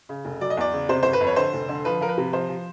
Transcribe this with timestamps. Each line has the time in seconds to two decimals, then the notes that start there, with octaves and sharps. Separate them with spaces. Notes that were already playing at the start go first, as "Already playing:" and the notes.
0.09 C#3
0.25 F1
0.41 F#3 D5
0.50 D#5
0.57 E2 D5
0.73 C#3
0.89 C3 C5
1.03 G1 C5
1.13 B4
1.21 F2
1.27 C#5
1.36 D3 C5
1.53 F1
1.69 D3
1.85 F3 B4
2.01 F3 A#4
2.08 B4
2.18 C3
2.33 F3 C5
2.49 F3